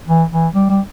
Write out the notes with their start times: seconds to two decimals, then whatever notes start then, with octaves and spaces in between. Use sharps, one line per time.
0.08 E3
0.32 E3
0.55 G3
0.70 G3